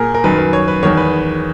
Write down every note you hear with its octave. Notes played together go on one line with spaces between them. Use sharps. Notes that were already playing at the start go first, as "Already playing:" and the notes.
Already playing: A#2 G#4 A#4
A#4
F#2 D#3 B4
B4
C#5
B4
E2 D#3 C#5
B4